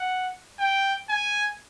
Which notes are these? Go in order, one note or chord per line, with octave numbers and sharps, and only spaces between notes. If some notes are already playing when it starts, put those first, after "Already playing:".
Already playing: F#5
G5
G#5